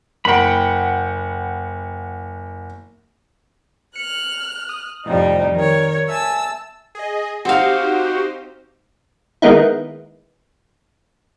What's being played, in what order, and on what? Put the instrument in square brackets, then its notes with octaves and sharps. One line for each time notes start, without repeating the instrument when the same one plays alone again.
[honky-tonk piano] F#1 F#5 [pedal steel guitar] G5 B5
[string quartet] F6 F#6 [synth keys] C#7
[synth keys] D#6
[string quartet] F2 G3 D#4 [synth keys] A2 C3 F3
[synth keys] D#3 [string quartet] A#4 C#5
[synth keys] E5 G#5 [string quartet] A5 E6
[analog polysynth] G#4 D#5
[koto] C4 F5 [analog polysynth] D#4 G4 C5 [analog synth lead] F#4
[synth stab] D#3 G#3 A#3 B3 D#4 E4